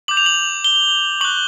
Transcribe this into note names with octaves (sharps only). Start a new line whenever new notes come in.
D6 G6 F#7
F7
F#7
G7
C#6 F#6 F#7